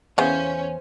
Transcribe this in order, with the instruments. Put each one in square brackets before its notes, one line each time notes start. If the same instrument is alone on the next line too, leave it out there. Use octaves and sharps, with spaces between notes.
[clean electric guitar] E2 G#5 [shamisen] C#3 E3 B3 [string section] C#4 [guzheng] C5